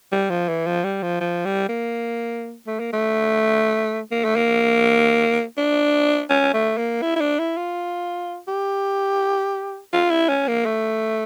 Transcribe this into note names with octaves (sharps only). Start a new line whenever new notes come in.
G3
F3
E3
F3
G3
F3
F3
G3
A#3
A3
A#3
A3
A#3
A3
A#3
D4
C#4
A3
A#3
E4
E4
D4
E4
F4
G4
F4
E4
C#4
A#3
A3